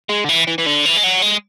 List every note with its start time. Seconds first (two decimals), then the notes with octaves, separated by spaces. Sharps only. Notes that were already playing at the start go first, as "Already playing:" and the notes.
0.09 G#3
0.24 D3
0.29 E3
0.47 E3
0.58 E3
0.66 D3
0.85 E3
0.97 G#3
1.04 F#3
1.22 G#3